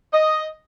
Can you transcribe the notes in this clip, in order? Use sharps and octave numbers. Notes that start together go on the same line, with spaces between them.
D#5